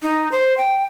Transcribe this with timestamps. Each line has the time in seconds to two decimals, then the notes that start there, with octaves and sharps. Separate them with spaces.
0.02 D#4
0.32 C5
0.57 G5